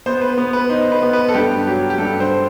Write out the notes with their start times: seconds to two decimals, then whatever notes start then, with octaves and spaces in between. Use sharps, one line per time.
0.06 B3 C5
0.21 B4
0.37 B3
0.53 B4
0.69 D#4 C5
0.92 B4
1.02 B3
1.13 B4
1.28 A4
1.34 G2 G4
1.67 F#3 G4
1.90 G4
1.98 G2 A4
2.20 C5